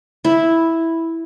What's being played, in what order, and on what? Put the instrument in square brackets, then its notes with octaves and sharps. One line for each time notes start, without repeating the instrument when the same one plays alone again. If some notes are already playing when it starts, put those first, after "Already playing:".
[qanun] E4